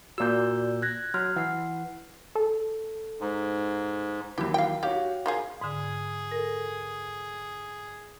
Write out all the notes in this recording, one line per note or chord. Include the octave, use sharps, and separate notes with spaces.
A#2 F#4 D5 E6 G6
F#6 G#6 A#6
F#3 C6 F6
E3 F#5 C7
A4
G#2
D#2 E3 F#3 E4 G4
F5 G5
F#4 G4 C#5 F5
D#3 F4 G#4
G#2 D3 G#4
A4 A#4